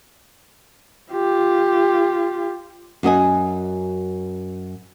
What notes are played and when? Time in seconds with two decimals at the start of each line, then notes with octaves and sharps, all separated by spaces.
1.12 F4 G4
3.03 F#2 F#4 D#5 G#5